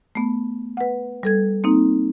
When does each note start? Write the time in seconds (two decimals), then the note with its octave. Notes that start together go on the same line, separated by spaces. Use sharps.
0.15 A3 B3
0.77 B4 F#5
1.23 G3 A4 G#6
1.64 A#3 C4 D#4